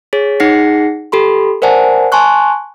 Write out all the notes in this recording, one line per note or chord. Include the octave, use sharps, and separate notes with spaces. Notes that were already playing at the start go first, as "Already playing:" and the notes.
G#4 C#5 B6
D#4 G#4 F#5 A#6 C7 C#7
G4 A4 B5 C6
A#4 C5 D5 F#5 G#5 A5
G#5 A5 C6 C#6 F#6